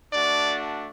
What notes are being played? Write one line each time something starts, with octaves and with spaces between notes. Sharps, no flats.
A3 D4 F#4 D5